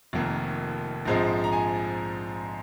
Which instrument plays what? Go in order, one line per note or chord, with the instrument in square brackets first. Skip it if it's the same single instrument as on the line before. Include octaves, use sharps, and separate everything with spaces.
[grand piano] F1 F2 D#3 A#3
A#1 G#2 F3 G#3 C4
A#5
G#5